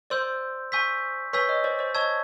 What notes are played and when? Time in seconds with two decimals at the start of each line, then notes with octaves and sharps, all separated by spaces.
0.10 C5 D5 C6 E6 G6
0.72 G#5 C#6 E6 G6 B6
1.33 B4 C#5 G#5 C#6 E6 G6 B6
1.49 C#5 D#5
1.64 C5 D5
1.79 C5 D5
1.94 C#5 D#5 A5 C#6 E6 G#6